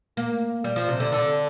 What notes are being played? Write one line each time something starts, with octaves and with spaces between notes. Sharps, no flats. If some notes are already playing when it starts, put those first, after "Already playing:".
A#3
G3
F3
C3
D3
D3